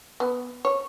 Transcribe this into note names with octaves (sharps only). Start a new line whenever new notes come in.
B3
C#5